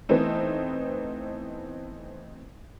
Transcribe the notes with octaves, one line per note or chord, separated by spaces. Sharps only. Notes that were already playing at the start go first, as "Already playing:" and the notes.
E3 A3 B3 C4 D#4